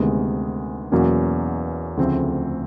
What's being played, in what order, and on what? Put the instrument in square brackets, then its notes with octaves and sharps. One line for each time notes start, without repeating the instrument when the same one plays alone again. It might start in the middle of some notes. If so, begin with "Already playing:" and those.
Already playing: [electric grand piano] D2 C3 D#3 G#3 B3
E2 B2 F#3 A#3 C#4
D2 C#3 F3 A3 C4